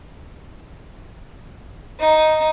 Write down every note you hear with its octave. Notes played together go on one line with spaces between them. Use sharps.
D#4